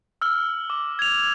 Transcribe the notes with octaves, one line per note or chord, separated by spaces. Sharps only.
E6 F6
D6
G#6 F7